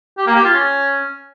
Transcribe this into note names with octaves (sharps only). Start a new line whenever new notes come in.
G4
A#3
G4
F4
C#4